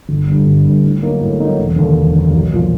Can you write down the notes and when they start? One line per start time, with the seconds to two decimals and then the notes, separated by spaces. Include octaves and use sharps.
0.09 G1
0.27 G2 D3 G3
0.47 G1
0.65 G2 D3 G3
0.83 A2
1.02 F#3 A#3 D#4
1.21 A2
1.39 F#3 A#3 D#4
1.58 E1
1.76 D#2 D3
1.96 E1
2.14 D#2 D3
2.32 B1
2.51 A#2 F3